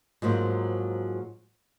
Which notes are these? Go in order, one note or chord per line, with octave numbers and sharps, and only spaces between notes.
G#2 F3 F#3 A#3